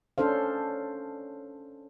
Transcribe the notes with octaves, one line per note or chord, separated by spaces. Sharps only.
C#4 D4 A4 C5 F5